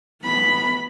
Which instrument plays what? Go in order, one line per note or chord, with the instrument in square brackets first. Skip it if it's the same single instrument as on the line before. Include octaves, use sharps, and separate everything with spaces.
[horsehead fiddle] B3 B5